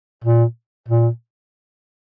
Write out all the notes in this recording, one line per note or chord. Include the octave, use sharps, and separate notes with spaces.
A#2
A#2